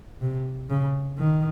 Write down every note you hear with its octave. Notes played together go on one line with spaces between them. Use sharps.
C3
C#3
D#3